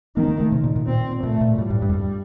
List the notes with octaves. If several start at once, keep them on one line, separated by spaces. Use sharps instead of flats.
D#3 A#3
C4
A#3
A3
C3
A#2
A#2
A#2 C4
A#2 A3
A#2
A2 G3
G2
G2
F2
G2